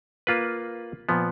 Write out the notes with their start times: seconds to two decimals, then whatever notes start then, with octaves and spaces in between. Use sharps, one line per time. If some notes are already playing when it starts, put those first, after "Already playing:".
0.27 A#3 F4 B4
1.09 A#2 F3 B3